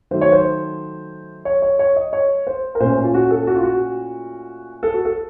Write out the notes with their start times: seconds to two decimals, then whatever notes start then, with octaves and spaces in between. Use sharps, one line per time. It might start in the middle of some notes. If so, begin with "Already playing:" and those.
0.11 D#3 F#3 A3 C5
0.21 C#5
0.32 C5
1.45 C#5
1.62 C#5
1.79 C#5
1.96 D#5
2.13 C#5
2.47 C5
2.75 A#4
2.80 A#2 A3 C#4 C5
3.04 F4
3.14 F#4
3.31 A4
3.47 F#4
3.56 F4
3.63 F#4
4.83 A4
4.94 F#4
5.05 A4